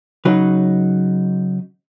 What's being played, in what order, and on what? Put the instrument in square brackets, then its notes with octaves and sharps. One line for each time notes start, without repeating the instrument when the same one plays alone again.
[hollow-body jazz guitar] C#3 F#3 D#4 B4